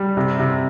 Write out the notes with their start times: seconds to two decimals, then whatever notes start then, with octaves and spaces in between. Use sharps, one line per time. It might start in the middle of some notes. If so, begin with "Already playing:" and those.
Already playing: G3
0.17 C3
0.39 C3